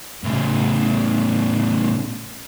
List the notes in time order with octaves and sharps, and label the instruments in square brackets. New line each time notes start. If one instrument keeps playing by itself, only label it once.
[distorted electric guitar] A2 C#3